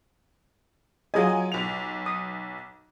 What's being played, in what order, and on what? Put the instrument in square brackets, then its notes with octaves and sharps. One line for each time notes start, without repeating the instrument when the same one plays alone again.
[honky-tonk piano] F#3 G#5 [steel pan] F4 G#4 D#5
[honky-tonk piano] B1 F7
[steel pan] D#6